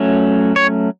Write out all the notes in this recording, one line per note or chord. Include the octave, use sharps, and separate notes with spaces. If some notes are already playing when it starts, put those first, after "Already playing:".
Already playing: F#3 A3 C#4
C#5